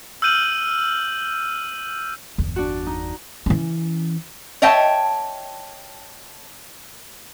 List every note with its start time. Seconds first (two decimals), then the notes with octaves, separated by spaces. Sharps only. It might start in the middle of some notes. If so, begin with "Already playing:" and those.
0.22 E6 F6 G6 D#7 F#7
2.38 G1 E2
2.56 D4 F#4
2.86 D#4
3.46 E3 C#4
4.62 C#5 D#5 E5 G5 A5